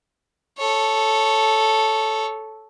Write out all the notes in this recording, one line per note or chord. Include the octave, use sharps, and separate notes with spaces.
A4 C#5